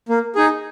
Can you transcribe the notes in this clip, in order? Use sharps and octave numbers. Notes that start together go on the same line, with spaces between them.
A#3
D#4 G#4